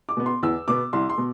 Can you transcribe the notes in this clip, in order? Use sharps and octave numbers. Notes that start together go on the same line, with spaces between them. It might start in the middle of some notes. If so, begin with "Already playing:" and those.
D6
B2 B3
C6
E2 E6
B2 B3 D6
C2 C6
C6
B2